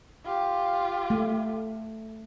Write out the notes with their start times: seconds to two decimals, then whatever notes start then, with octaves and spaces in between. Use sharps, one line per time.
0.25 F4 G4
1.10 A3